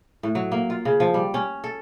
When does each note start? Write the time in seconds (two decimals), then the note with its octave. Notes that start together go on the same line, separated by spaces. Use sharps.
0.23 A2
0.35 F#3
0.52 A#3
0.70 F4
0.85 C#3
1.00 F3
1.14 G3
1.34 C#4
1.64 A4